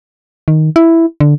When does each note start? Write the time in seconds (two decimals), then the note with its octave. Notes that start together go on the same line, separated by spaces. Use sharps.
0.48 D#3
0.76 E4
1.20 D3